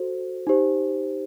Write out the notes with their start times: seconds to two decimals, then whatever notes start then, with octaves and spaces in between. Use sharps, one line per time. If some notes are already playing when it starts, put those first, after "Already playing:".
Already playing: F#4 A4 C5
0.47 D#4 G4 C5